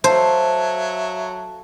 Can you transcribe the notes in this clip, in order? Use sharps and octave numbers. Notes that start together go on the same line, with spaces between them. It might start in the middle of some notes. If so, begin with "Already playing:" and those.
F#3 A4 C5 E5 F5